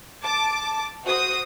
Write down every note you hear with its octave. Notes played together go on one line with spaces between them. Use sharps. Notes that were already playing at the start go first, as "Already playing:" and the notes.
A5 D6
F#4 C5 D#6